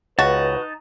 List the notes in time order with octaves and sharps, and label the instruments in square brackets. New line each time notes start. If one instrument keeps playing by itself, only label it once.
[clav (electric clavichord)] C#2 [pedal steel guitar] D#4 A5 [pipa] F#4 [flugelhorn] B4